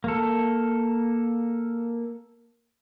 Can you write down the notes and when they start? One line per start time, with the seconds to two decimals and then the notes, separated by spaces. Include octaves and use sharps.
0.04 A#3 A4